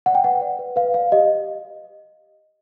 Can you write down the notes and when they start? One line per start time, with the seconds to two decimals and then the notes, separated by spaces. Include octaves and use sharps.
0.06 D5 F#5
0.15 G5
0.24 B4 F#5
0.41 D5
0.59 B4
0.76 B4 F5
0.94 D5 F5
1.12 G4 D#5